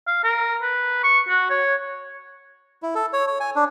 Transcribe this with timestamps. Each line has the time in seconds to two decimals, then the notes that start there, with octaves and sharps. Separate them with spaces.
0.07 F5
0.24 A#4
0.62 B4
1.03 C#6
1.29 F#4
1.50 C#5
2.83 E4
2.95 A4
3.13 C#5
3.27 C#5
3.40 G#5
3.56 D4